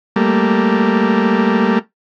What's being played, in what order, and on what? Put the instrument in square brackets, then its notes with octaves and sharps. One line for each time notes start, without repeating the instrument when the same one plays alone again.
[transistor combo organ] G3 A3 A#3